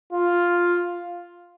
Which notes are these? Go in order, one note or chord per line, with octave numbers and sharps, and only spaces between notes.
F4